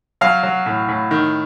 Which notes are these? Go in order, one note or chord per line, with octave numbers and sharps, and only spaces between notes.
F#3 F5
F#3
A2
A2
D#3